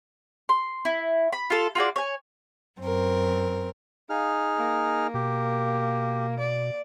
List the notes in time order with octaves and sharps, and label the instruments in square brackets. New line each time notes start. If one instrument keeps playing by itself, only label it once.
[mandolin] C6
E4
B5
F4 A4
F4 F#4 G#4 D5
C#5 G#5
[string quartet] F#2 C4 A#4
[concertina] D#4 G#4 F6 [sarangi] F5
[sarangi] A#3
[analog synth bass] B2 [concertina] G4
[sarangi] D5